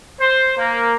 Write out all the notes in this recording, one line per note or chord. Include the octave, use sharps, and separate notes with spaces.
C5
A#3